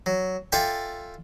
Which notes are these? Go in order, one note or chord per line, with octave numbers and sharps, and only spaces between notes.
F#3
F4 A4 D5 E5 G5 G#5